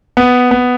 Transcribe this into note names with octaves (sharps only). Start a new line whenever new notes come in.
B3
B3